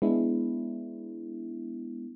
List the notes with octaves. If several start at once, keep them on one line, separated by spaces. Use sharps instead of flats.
G#3 B3 D4 E4